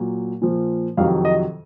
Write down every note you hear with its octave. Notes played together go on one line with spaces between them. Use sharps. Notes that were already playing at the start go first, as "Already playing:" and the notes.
Already playing: A#2 F#3
A#2 F3
F2 C3 D#3 F#3 F5
D#5